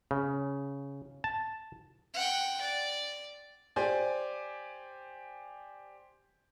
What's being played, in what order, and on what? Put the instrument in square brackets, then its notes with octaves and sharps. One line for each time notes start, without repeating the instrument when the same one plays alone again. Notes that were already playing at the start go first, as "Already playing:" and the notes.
[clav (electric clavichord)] C#3
A5
[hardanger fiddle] F#5 G5
D5
[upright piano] G4 C5 D5 G#5